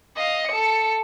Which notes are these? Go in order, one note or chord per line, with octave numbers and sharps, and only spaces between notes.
D#5 F5
A4 C#7